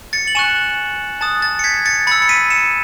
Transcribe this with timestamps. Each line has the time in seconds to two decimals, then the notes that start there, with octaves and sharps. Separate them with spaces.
0.13 A6 C#7
0.27 F#7
0.35 G#5 C#6 F#6 C#7 E7
1.21 A5 D#6 F#6 A6
1.42 A6
1.59 C#7
1.64 G#6 B6
1.86 A6 C#7
2.07 B5 A6 C#7
2.11 E6
2.22 C#7
2.29 B6 D#7
2.50 C#7 E7